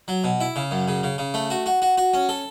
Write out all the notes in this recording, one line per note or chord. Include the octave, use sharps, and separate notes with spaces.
F#3
B2
E4
C#3
F#2
C#3
C#3
C#3
A3
F#4
F#4
F#4
F#4
C#4
A4